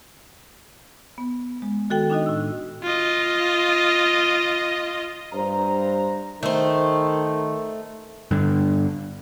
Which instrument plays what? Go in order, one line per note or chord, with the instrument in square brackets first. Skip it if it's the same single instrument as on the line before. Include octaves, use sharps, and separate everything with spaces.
[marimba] B3
G#3
D#3 F#4 A4 G5
D4 D#4 F#4 D#5
A2 E6
[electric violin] F4 D#5
[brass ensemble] G2 C5 A#5
[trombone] D#3 [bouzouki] A3 C5
[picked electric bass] G2 D3